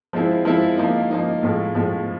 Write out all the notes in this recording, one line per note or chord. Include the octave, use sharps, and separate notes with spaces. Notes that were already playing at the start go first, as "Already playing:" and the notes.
F3 G#3 C4 E4
F3 G#3 C4 E4
F3 A#3 D#4
F3 A#3 D#4
A2 F3 G#3
A2 F3 G#3